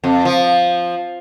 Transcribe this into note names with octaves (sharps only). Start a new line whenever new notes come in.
F2
F3